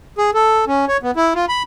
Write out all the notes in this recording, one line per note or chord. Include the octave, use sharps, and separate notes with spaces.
G#4
A4
C#4
C#5
B3
E4
F4
B5